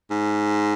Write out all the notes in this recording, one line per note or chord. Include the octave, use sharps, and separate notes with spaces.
G#2